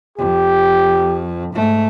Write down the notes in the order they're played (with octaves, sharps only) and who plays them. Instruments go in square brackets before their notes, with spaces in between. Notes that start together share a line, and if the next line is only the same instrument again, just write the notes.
[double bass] F2 [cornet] G4
[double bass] G#2 A3